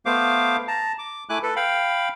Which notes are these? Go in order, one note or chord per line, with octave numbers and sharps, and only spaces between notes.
A3 B3 C5 F5 D6
A5 A#5
D6
A3 E4 G#5 D6 F#6
A4 B4
F5 G5 B5